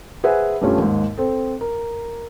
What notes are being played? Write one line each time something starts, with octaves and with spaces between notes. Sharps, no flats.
G#4 B4 C5 E5 F#5 G#5
G2 G3 A3 C#4 F4
D#2 G#2
C4 A4
A#4